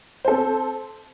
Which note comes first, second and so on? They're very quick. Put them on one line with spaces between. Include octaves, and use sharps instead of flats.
C5 A4 C4